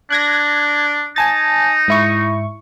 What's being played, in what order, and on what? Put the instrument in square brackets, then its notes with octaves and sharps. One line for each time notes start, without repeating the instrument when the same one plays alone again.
[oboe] D4 [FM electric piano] F#6 G#6 A#6
[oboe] D#4 [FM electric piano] G#5 A5 A6
[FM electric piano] G#2 E4 C#6